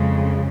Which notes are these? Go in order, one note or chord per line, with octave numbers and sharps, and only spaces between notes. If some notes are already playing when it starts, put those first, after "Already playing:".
Already playing: F2 C#3 G#3